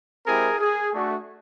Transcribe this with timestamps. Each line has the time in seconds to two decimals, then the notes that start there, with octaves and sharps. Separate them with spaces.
0.26 G#3 C4 E4 G4 G#4 A#4
0.59 G#4
0.92 A3 D4 F#4